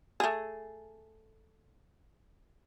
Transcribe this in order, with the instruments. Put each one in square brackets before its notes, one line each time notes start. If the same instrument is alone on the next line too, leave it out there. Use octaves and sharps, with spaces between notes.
[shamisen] A3 G#4